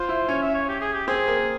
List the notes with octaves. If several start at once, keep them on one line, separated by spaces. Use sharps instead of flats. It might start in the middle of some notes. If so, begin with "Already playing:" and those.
Already playing: F4 C5
E4
C#4 C#5
E5
C#5
G4
G#4
G4
C4 G#4
A#3